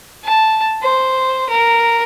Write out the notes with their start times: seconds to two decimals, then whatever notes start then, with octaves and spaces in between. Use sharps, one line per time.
0.24 A5
0.82 C5
1.49 A#4